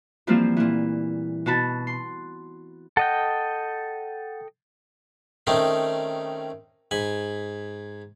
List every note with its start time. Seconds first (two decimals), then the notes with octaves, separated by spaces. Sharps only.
0.27 E3 F3 G3 A#3 C4 F4
0.57 A#2 E3
1.46 B2 F#4 A5 B5
1.87 C6
2.97 A4 D#5 F#5 G5
5.47 D#3 A3 C4 C#4 D#4
6.91 G#2 G#5 B5